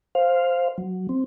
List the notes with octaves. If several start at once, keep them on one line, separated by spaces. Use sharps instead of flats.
C5 F5
F#3
C4